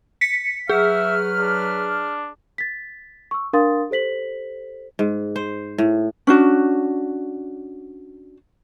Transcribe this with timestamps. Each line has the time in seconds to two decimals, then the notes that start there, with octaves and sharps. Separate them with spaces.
0.21 B6 C#7
0.70 F#3 G#4 B4 E5 F6
1.39 D4
2.58 A6 B6
3.31 C#6 E6
3.53 D4 A#4 F5 C6 D#6 A6
3.90 G4 A4 C5 B6 F#7
4.99 G#2
5.36 C5
5.78 A2
6.27 C#4 D4 F#4